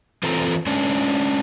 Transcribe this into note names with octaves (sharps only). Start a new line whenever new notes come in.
E3 C4 F4 A4 C5 A#5
G#3 C#4 D4